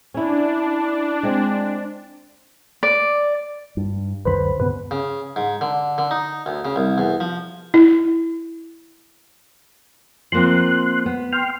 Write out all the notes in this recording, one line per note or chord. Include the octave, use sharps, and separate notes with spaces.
C#4 D4 E4
G#3 C4
D5
G2
C#2 F#2 D3 B4 C5 B5
G2 C#3 B3 B4
C#3
G#2
D3
D3
D#4
D2
C#3
C2
E2
F3
E4
F3 A#3 C4 C6 F#6
B3
G5 C6 F6